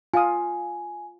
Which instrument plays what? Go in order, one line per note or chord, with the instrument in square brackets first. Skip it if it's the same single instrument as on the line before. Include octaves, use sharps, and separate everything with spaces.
[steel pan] F4 F5 D#6 [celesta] G#5